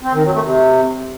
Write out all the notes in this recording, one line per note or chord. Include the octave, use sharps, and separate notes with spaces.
C4
D#3
F#3
A3
C3